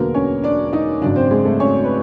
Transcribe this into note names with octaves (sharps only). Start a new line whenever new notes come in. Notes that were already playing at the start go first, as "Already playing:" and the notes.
Already playing: E1 D2 D3 F#3 A#3 B3 A#4
C#4 C#5
D4 D5
D#4 D#5
G#1 F#2 C#3 D4 D5
C4 C5
G#3 G#4
A3 A4
C#4 C#5
B4